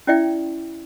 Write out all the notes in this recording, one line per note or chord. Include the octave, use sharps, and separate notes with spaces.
C#4 E4 D5 E5 G5